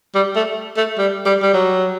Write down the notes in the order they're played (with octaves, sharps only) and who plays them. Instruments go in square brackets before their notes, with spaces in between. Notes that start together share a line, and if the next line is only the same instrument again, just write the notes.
[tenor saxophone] G3
A3
A3
G3
G3
G3
F#3